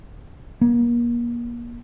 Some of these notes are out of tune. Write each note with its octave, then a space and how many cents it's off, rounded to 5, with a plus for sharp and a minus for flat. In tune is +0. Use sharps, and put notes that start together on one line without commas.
A#3 +35